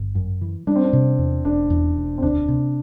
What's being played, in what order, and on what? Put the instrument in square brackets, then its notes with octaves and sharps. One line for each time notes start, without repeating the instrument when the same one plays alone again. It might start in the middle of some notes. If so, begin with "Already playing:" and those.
Already playing: [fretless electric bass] G1
F#2
E3
[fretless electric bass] G3 [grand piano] D4
[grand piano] C4
D4
[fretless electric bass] C3
E2
[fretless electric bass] E1 [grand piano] D4
[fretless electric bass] E2
E1
[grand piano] C4
[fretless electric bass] D2 [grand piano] D4
[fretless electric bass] C3